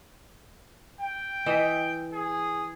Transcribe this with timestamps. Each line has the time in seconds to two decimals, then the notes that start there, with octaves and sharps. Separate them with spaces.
1.01 G5
1.46 E3 D#5 E5
2.13 G#4